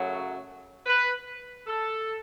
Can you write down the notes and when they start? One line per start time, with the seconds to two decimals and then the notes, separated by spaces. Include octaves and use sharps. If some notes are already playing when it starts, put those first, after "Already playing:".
Already playing: F#2 C#3 F#3 A3
0.86 B4
1.67 A4